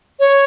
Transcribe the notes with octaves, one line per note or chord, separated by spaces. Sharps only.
C#5